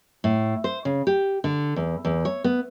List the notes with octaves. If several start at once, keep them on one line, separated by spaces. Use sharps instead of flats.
A2
C5
C#3
G4
D3
E2
E2
C#5
B3